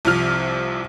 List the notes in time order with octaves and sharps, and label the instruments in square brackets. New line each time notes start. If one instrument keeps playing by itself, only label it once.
[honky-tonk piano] C2 C3 F3 F6